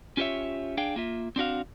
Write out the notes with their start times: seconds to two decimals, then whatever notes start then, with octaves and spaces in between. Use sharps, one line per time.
0.17 C#4 F4 G4 C5 C#5 E5
0.77 D4 G#4 F5 G5
0.96 A#3 F4 E5
1.36 C4 D4 F#4 F5